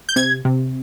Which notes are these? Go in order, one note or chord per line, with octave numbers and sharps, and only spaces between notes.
G6
C3 G#6
C3